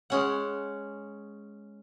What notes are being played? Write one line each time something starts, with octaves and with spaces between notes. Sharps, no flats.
G#3 C#4 F#5